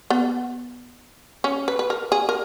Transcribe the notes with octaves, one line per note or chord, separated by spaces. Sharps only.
B3
C#4
B4
B4
A#4
G#4
A#4